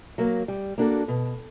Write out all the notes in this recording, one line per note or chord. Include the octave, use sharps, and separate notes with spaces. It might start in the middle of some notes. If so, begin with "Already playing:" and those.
F#3 A#3
G3
A#3 D4 F#4 A4
B2